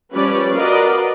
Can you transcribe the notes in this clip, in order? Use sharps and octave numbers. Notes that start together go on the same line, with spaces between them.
F3 G3 C#4 B4 C#5 D5
F#4 A#4 B4 D5 D#5 F5